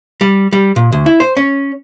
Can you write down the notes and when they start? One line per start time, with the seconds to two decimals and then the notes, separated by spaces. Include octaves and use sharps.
0.21 G3
0.53 G3
0.76 A#2
0.92 D2
1.06 E4
1.20 C5
1.37 C#4